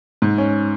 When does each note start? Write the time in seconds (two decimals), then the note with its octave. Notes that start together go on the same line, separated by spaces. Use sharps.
0.22 G#2
0.38 C#4